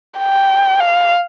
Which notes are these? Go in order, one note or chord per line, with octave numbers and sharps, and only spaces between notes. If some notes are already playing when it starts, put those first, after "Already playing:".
G5
F5